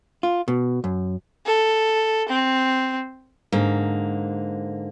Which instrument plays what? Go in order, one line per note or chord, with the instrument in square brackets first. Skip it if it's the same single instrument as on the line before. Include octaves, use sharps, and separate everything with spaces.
[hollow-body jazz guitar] F4
B2
F#2
[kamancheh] A4
C4
[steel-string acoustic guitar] G#2 D3 A#3